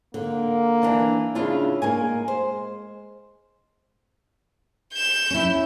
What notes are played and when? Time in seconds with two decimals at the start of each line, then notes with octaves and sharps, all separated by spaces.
0.14 D3 A#3
0.83 E3 D4
1.35 C#3 D4 E4 F4
1.82 G#3 A#3 A#4 G#5
2.28 C5
4.93 G6 E7
5.31 C#4 E4